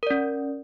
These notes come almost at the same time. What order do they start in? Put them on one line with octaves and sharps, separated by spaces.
A#4 D5 C#4